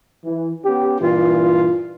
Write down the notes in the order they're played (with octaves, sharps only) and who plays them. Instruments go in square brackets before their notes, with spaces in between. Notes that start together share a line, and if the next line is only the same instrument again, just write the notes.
[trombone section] E3
B3 C#4 G4
[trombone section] G2 A#2 E3 [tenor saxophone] F4